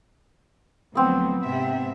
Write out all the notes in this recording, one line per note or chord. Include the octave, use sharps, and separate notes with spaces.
D2 F3 F#3 B3 C4
G#2 C3 E5